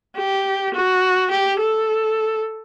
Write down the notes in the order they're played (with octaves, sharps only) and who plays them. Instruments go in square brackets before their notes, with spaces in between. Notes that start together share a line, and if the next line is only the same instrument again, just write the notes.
[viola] G4
F#4
G4
A4